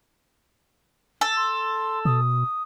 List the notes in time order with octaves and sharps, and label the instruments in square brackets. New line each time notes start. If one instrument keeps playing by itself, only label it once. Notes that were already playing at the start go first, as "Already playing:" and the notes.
[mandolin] A4
[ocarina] C6
[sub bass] B2 [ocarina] D#6